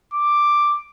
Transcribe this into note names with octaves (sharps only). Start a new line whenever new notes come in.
D6